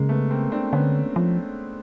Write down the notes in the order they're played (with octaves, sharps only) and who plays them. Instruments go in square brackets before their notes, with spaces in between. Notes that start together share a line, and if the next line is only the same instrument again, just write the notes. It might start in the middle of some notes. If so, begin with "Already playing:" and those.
Already playing: [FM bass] C#3 [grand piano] G#3 A#3
[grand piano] A3 B3
A#3 C4
C4 D4
[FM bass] D3 [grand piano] B3 C#4
[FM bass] F3